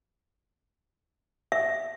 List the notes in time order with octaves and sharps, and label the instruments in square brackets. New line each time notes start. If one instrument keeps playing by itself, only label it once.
[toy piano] E5